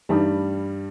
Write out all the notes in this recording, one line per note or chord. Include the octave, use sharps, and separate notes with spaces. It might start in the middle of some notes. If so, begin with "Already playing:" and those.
G2 E3 G3 A3 D#4